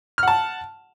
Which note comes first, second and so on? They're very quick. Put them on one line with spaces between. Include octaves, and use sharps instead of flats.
F6 F#5 A5